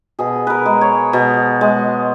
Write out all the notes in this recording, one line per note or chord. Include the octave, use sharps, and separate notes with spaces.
B2 G#4
A#4 B4
G#3
C#5
B2
G#3